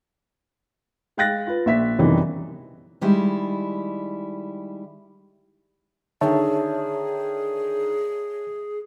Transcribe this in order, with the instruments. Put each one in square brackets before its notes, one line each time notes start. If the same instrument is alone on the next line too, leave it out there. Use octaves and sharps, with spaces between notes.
[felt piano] G#3 F5 G5 F#6 A6 A#6
F4 B4
A#1 E5 B6
B1 F#2 C3 D#3 E3 G3
[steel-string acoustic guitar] D#3 G3 G#3 E4
[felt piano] D3 D#3 [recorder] G#4 [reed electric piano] C#5 E5 A5